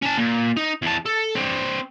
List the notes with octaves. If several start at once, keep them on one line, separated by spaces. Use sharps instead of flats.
C#4 A5
A#2
D#4
E2 A5
A4
C4 D4